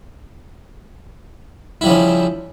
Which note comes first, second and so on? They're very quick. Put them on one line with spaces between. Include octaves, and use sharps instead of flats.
E4 G3 F3 C#3